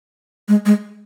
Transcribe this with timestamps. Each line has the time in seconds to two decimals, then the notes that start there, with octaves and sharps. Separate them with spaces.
0.48 G#3
0.66 G#3